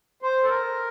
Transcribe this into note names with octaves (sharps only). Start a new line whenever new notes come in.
C5
A4
A#4